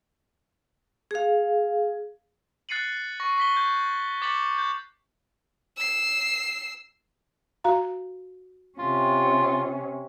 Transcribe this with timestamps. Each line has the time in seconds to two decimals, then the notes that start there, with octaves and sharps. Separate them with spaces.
1.11 G#4 F5
2.69 F#6 A6 C7 C#7 D#7 F#7
3.20 C#6 A#6
3.38 C#6 B6 G7
3.57 G6
4.22 D6 A6 B6 C#7 E7 F#7
4.58 G6
5.77 E6 C7
7.64 F#4 F5 A#5
8.79 C3 C#4 F4